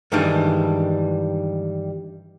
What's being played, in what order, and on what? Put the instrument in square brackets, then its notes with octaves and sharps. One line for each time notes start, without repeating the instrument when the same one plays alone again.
[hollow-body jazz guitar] G2 D#3 E3 G3 G#3 D4